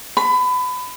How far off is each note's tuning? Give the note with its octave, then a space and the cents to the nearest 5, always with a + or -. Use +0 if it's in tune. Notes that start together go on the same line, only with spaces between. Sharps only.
B5 +25